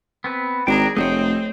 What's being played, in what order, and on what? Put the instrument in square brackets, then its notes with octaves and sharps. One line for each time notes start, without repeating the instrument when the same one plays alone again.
[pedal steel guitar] B3 C4 B4
[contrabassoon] G#1 [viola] D4 G#4 [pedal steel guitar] G5 A#5
[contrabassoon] F1 [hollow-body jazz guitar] A3 C#5 [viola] C4 [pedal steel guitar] D#5